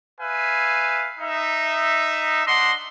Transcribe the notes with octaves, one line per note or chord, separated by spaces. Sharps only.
B4 E5 F5 G#5
D#4 E5
D4 D#5 F#5 C6